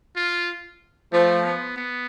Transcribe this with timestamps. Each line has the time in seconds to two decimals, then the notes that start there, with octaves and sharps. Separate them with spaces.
0.16 F4
1.13 F3 A3
1.45 B3
1.77 B3